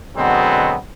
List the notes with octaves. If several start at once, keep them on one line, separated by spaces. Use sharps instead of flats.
B2 D3 F#3 G#3 B3 C4